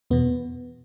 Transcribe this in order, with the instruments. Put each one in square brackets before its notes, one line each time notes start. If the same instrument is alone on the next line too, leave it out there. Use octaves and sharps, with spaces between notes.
[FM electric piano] E2 B2 B3